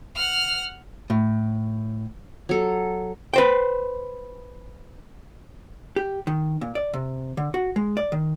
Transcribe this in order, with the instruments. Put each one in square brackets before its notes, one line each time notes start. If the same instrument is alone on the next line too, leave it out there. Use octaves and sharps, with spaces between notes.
[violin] F#5 F6
[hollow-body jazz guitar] A2
[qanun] F#3 A4
[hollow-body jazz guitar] B4 C5 G5
G4
D#3
A#2
D5
C3
D3
F#4
G#3
D5
D#3